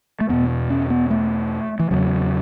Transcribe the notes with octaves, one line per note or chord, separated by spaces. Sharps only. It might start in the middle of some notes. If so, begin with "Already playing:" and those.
A3
E2 B2 B3
C#4
B3
A3
E3
E2 C#3 F#3